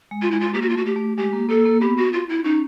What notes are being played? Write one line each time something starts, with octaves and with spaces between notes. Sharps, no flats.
G#3
F4
G#3 E4
F4
A#3 G4
F#4
F4
A3 F#4
G4
A3
G#3 G4
A#3
A#3 A4
A#3
B3 G4
F#4
F4
E4
C#4 D#4